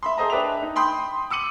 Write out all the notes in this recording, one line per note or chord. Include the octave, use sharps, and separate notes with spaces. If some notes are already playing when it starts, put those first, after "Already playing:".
E5 B5 C6
G#4 A4 C5 D#5 A#5
D4 B4 E5 G5 D6 F7
D#4
G5 B5 C6 D#6 G6
D6 E6 C#7 D#7 F#7